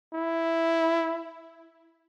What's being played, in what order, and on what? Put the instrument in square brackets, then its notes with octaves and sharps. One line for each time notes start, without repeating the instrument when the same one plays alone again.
[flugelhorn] E4